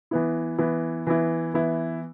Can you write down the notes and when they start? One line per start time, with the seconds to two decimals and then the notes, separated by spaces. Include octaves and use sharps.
0.11 E3 B3 E4
0.58 E3 B3 E4
1.07 E3 B3 E4
1.54 E3 B3 E4